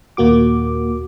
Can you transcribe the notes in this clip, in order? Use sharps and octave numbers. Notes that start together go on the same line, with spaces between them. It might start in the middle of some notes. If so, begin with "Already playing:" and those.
D#2 A#2 A#3 F#4 D6